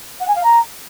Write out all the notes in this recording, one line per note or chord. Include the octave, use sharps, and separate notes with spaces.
F#5
G#5
F5
A#5